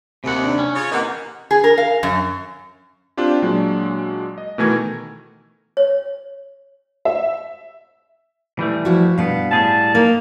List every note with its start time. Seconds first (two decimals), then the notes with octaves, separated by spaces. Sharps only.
0.24 D#2 C3 F#5
0.44 D4
0.59 C#4
0.75 C#3 F4 C#5 C#6
0.92 C3 E3 A#3 D#5 F#5
1.51 G#4
1.64 A#4
1.78 F5
2.03 F#2
3.17 C4 D4 F4 G4
3.42 A#2 F#3 G#3 D4
4.38 D#5
4.58 B2 D#3 E3 A3 A#4 G#6
5.77 C#5
7.05 E5
8.59 E3 G3 A3
8.85 F3 E4 F#4
9.18 G2 B2 B3 F5 F#5
9.51 A2 G3 G#4 A5
9.95 A#3 D#4